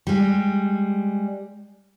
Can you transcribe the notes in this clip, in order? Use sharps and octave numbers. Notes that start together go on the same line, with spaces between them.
G3 G#3